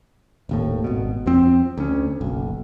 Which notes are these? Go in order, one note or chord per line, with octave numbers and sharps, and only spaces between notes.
D#1 D#2 A2
G#1 B2
F2 F3 C4
D2 C#4
F#1 B1